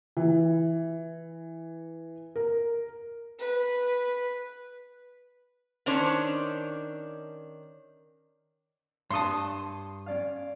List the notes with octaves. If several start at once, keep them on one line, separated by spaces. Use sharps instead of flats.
E3
A#4
B4
D#3 C#4 D4 C5 C#5
G2 A5 C6 D#6
C#4 D5 F5